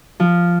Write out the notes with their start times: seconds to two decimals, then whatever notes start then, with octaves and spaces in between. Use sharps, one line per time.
0.20 F3